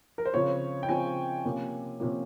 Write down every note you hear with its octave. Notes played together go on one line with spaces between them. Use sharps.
A#4
C5
C#3 F3 C4 C#5
G5
C#3 F3 C4 G#5
C3 F3 A#3 C#4
C3 F3 A#3 C#4